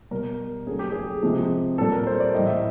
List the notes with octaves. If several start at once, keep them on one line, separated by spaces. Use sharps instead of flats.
B2 G3 A#4
C#3 F#3 A3 G#4
G4
G#4
C3 F3 G#3
A#2 G3 A4
A#4
C5
D5
A2 E3 G3 D#5
E5